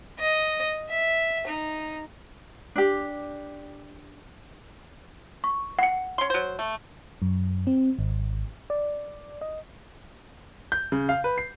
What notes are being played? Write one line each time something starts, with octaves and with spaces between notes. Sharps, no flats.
D#5
E5
D#4
D4 G4
C#6
F#5 C#7
C#4 C6
F#3 C5
A3
F#2
C4
G#1
D5
D#5
G6
C#3
F5
B4
C7